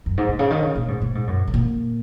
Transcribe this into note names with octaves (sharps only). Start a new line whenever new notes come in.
F#2
G#2
A#2
C#3
D#3
C#3
A#2
G#2
A#2
G#2
F#2
C#3
A#2